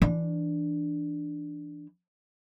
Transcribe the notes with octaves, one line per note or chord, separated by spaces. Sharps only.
E3 D4